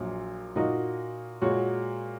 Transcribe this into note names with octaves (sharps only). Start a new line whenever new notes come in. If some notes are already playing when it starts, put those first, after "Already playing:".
Already playing: A#1 A#2 F#3
A#2 A#3 D#4 F#4 D#5
A#2 G#3 F#4 C#5